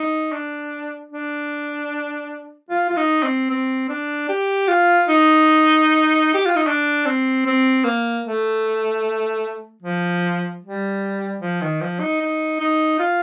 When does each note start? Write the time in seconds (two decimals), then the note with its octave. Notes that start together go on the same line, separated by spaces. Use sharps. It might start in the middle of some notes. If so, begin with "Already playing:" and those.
Already playing: D#4
0.32 D4
1.12 D4
2.70 F4
2.90 F4
2.97 D#4
3.23 C4
3.50 C4
3.89 D4
4.29 G4
4.68 F4
5.08 D#4
6.34 G4
6.46 F4
6.56 D#4
6.67 D4
7.06 C4
7.46 C4
7.84 A#3
8.25 A3
9.82 F3
10.63 G3
11.41 F3
11.61 D#3
11.81 F3
12.00 D#4
12.21 D#4
12.60 D#4
12.99 F4